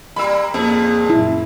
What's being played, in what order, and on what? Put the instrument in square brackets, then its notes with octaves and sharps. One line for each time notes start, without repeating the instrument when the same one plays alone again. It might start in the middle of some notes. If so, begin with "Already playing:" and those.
[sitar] G3 A#3 [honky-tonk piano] B5 E6
[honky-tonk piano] F2 [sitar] A#2 G#4 [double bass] A#3
[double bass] A#1 F#2 [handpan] E4